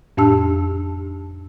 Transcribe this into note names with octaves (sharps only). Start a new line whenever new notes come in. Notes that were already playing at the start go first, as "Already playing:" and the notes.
F2 A2 D4 G4 A5 E6